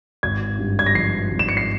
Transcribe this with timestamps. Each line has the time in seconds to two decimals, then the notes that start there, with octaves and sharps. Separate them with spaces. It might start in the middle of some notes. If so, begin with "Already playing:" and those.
0.23 G#1 G#6
0.59 G2
0.79 G#6
0.86 A#6
0.95 F3 C7
1.31 G#1
1.39 E7
1.49 C#7
1.57 C7